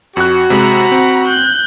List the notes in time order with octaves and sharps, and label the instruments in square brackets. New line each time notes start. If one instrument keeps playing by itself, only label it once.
[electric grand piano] F2 F#6 [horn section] F#4
[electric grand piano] C3 G#3 [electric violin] A#5 B5
[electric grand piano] C4
[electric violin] F#6 G6